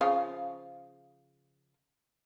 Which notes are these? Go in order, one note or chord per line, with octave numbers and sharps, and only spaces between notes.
C#3 F3 F5